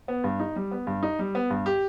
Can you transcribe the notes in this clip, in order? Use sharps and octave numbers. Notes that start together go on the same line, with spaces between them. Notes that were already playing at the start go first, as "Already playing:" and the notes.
B3
G2
D#4
G3
B3
G2
D#4
G3
B3
G2
G4